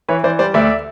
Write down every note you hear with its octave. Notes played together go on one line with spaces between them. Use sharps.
E3 B4 C#5
E3 C5 D5
G3 C5 D5
D2 D5 E5